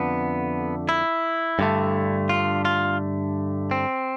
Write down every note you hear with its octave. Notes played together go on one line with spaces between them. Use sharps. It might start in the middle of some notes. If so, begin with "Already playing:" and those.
Already playing: F2 D3 A3 B3
E4
G2 D3 A3
F4
F4
C4